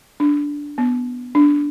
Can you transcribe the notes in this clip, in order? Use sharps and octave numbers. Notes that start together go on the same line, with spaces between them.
D4
B3
D4